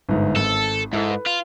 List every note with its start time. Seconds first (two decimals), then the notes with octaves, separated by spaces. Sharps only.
0.09 G1 G#2
0.36 G#1 A4
0.93 G#2 E4 A4
1.09 B4
1.26 F4